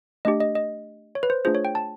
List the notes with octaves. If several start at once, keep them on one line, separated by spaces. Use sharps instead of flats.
A3 D4 G4 D#5
D#5
D#5
C#5
B4
C5
A3 D4 F4 G#4 C5
C#5
G5
A5